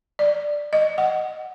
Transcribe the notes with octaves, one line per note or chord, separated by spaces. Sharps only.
D5
D#5
F#5